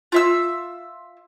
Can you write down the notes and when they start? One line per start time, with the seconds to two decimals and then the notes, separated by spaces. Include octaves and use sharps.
0.12 F4 E5 E6